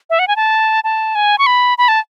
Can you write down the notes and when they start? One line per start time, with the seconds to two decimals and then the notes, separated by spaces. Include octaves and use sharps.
0.10 E5
0.19 F#5
0.28 G#5
0.36 A5
0.84 A5
1.15 G#5
1.38 C#6
1.46 B5
1.78 B5
1.88 A5